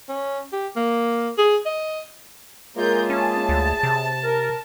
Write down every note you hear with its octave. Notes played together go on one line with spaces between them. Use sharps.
C#4
G4
A#3
G#4
D#5
G#3 A#3 F4 G#4 A#4 C#5 E5 G6
C#4 A5
D2
C3
A#4